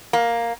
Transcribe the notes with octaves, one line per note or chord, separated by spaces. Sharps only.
A#3